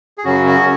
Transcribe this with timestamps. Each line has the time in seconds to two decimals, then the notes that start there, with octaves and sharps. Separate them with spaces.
0.18 G#4
0.24 F#2 C#3 F#3 C#4 F#4
0.46 C#4 F#4